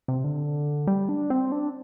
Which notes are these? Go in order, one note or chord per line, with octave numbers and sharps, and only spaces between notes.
C3
D3
G3
D4
C4
D4